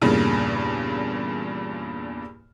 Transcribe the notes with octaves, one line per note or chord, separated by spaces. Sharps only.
E2 G2 A#2 C#3